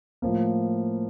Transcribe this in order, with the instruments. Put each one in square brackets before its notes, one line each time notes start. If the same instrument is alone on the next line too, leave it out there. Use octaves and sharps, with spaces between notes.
[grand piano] A2 F3 A#3